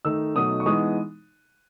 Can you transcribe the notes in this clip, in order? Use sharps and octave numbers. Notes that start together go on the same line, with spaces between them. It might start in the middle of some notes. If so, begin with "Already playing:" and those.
D#3 A3 D#4 E6
B2 F#3 A3 D#4 D#6
C#6
E3 G#3 B3 D#4 D#6